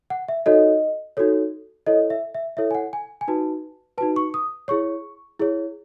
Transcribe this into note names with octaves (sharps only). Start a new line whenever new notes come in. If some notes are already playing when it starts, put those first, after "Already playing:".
F#5
E5
D#4 F#4 A4 C#5 D#5
D#4 F#4 A4 C#5
E4 A4 C#5 D#5
E5
E5
E4 A4 C#5 E5
G#5
F#5
G#5
G#5
D#4 F#4 B4 A5
D#4 F#4 B4 A5
C#6
D#6
E4 G#4 C#5 C#6
E4 G#4 C#5